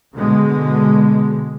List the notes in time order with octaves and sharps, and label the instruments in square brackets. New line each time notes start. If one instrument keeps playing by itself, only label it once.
[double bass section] B2 D3 G#3